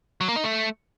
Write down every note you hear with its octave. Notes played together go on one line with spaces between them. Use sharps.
F#3
A#3
D#4
A3